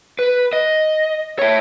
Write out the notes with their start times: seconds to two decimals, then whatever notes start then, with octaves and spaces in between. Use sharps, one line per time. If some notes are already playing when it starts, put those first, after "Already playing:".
0.19 B4
0.53 D#5
1.39 E4 C#5